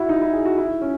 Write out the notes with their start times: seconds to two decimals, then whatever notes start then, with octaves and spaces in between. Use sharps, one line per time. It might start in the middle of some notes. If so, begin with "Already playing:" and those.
Already playing: E4 F#4
0.09 D#4
0.22 E4
0.33 G#4
0.45 F#4
0.58 E4
0.81 C#4